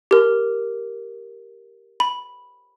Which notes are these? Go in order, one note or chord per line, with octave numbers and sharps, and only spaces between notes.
G4 A#4
B5